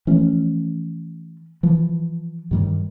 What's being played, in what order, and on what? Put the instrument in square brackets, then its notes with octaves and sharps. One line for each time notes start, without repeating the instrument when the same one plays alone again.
[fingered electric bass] E3 F3 A3 C#4
E3 F3
G2 D#3 G3